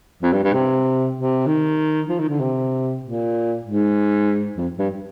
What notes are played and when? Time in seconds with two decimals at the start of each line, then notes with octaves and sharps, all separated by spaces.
0.23 F2
0.33 G2
0.43 G2
0.53 C3
1.15 C3
1.46 D#3
2.09 F3
2.19 D#3
2.29 D3
2.40 C3
3.03 A#2
3.64 G#2
4.58 F2
4.79 G2